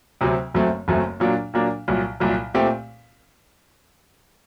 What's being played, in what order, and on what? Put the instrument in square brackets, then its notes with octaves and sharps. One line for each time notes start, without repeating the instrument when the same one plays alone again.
[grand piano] D2 C3 F#3 C4
F#1 F#2 F#3 A3 C4
F#1 F#2 F#3 A3 C4
A#2 F#3 A#3 D4
A#2 F#3 A#3 D4
C2 A#2 F#3
C2 A#2 F#3
A#2 A3 C4 G4